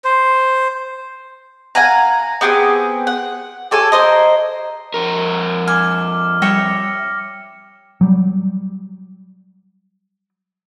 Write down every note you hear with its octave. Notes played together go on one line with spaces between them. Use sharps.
C5
F5 F#5 G#5 A#5
B3 C4 G4 G#4
F#5
G4 A4 C#5 G#5
A#4 C5 D#5
F2 A#4
G#5 D6 F6
G3 C#5 E5 G5 A#6 C#7
F#3 G3